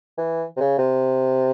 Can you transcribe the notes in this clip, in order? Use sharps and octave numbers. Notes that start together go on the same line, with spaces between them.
E3
C3
C#3
C3